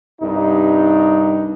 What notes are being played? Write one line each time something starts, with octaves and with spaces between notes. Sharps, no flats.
C2 G2 D#4